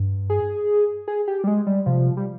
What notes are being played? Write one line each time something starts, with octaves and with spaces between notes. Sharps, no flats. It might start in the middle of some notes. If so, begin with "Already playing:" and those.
Already playing: G2
G#4
G#4
G4
G3
G#3
G3
C3 F3
G3